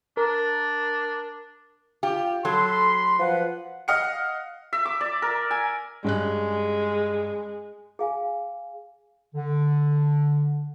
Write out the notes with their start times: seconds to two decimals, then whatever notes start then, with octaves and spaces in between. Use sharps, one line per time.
0.17 D4 A#4
2.03 F4 G4
2.45 F#3 A4 B5 C6
3.19 F3 B4 F#5
3.88 D#5 F5 F#5 F6 C#7
4.73 E5
4.85 D6
5.01 D5
5.22 A#4
5.51 G#5
6.04 G2 G#3 C#4 F#6
7.99 G#4 F5 G#5
9.35 D3